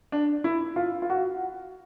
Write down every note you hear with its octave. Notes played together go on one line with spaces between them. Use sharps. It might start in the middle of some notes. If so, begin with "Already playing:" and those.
D4
E4
F4
F4
F#4